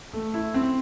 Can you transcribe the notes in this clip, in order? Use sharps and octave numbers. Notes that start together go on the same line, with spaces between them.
A3
E4
C4